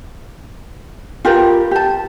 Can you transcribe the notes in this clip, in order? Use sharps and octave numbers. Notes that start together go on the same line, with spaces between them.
F4 G4 A#4 B4
G4 A5